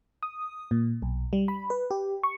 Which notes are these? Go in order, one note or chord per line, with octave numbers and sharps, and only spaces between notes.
D#6
A#2
B1
G3
B5
B4
G4
C#6